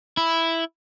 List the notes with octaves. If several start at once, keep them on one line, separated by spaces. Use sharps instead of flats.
E4